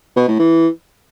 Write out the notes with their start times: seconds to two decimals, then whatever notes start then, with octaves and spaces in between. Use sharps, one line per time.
0.16 B2
0.28 A2
0.39 E3